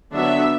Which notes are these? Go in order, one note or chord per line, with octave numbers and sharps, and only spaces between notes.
D3 F#3 B3 D4 E5